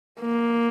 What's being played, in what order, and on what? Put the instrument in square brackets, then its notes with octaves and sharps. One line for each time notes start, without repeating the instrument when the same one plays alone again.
[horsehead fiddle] A#3